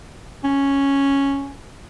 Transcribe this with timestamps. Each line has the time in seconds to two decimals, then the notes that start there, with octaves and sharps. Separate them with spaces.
0.44 C#4